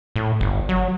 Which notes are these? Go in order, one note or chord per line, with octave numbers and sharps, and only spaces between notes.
A2
G1
F#3